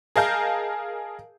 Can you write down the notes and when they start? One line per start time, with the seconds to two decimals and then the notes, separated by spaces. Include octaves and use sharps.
0.16 G#4 A#4 D#5 F5 A5 G6